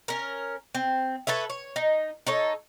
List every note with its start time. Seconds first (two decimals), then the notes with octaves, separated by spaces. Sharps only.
0.08 C#4 A#4
0.75 C4
1.27 A4 B4 C#5 E5
1.50 C#5
1.76 D#4
2.27 D#4 A4 C#5